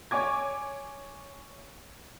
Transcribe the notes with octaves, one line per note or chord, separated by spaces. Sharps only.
C#5 G#5 D6 G#6